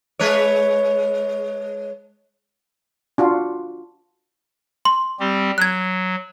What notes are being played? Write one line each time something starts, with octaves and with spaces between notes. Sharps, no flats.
G#3 B4 C#5
D4 F4 F#4
C6
G3 C4 G4
F#3 F#6 G#6